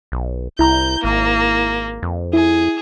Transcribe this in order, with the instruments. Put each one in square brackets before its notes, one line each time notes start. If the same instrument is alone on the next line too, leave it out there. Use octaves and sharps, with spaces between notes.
[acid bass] B1
[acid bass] C2 [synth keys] E4 A#5 [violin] G6
[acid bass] G#1 [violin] A#3
[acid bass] F2
[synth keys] E4 [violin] G#4